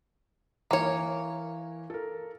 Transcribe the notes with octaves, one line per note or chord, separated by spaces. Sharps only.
E3 A#3 A#4 C#5
A4 A#4